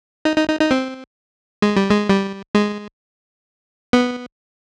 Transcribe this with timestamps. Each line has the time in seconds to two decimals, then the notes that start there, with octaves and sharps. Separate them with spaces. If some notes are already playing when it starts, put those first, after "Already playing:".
0.25 D#4
0.37 D#4
0.48 D#4
0.60 D#4
0.71 C4
1.62 G#3
1.76 G3
1.90 G#3
2.09 G3
2.55 G#3
3.93 B3